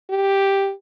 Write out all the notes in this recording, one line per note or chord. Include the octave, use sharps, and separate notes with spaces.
G4